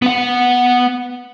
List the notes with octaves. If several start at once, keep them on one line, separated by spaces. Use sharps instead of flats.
B3 F#5